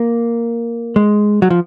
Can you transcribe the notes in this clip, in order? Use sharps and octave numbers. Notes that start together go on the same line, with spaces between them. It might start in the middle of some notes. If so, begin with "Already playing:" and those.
Already playing: A#3
G#3
F#3
F3